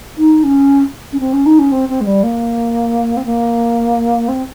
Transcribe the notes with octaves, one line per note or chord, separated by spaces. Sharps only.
D#4
C#4
C#4
C4
C#4
D#4
C#4
C4
C4
G#3
G3
A#3
C4
A#3
C4